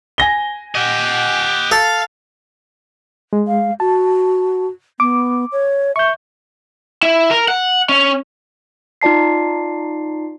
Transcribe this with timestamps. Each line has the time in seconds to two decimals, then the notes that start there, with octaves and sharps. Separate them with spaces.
0.18 G#5 A#6 G7
0.75 G4 D#5 F#5
1.71 A4 F5
3.33 G#3
3.47 F5
3.80 F#4 A5
5.00 B3 D6
5.52 C#5
5.96 E5 C#6 G6
7.03 E4
7.31 A#4
7.48 F#5
7.89 C#4
9.02 D#4 F4 D5 A5 C7